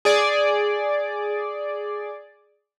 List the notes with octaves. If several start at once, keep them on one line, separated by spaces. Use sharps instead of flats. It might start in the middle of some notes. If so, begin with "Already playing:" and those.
G#4 D5